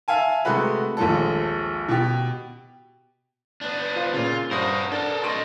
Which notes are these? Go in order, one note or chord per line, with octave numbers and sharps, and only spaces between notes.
E5 F5 G#5 A5
C3 G#3 A3 F#4 B4
A#1 D#2 F3 G#3 A4
B2 G4
B3 D4
F4 C5 F5
A#2 C#3 F4
G2 F#4 A#4 C5 D#6
D4 A4 A#4
F#4 A4 D#5 C6 D7 D#7